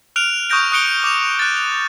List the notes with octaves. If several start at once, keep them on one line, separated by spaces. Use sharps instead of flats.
F6 F#6 D7 F7
C#6 D#6 F#6 G6 A#6 D7
C#6 D#6 F#6 C#7 D7 G7
D6 F7
F#6 A6
F7